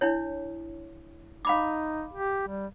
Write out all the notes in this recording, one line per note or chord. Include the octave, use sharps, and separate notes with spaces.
D4 E4 C#5
D#4 F5 B5 D6
G4
G3